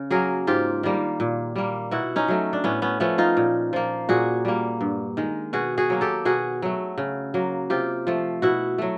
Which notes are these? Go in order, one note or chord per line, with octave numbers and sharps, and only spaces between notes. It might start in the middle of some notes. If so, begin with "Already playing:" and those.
Already playing: C#3
F#3 A#3 G#4 A#4
G#2 F4 G4
D#3 G3 A#3
A#2
G3 A#3
B2 E4 F#4
C#4 D#4
F#3 A3
D4
A2 B3 C#4
B3 C#4
F3 A3 B3 C#4
D#4 F4
A#2
F3 A#3
A#2 F#4 G#4
G3 A#3
G2
D#3 G#3
B2 F#4 G#4
F#4 G#4
F#3 A#3
G4 A4
B2 F#4 G#4
F#3 A3
C#3
F#3 A#3
C3 F4 G4
F3 A3
B2 E4 F#4
F#3 A3